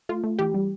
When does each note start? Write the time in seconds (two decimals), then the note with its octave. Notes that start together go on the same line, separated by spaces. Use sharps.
0.09 A3 F4
0.24 A3
0.39 E3 G4
0.54 G3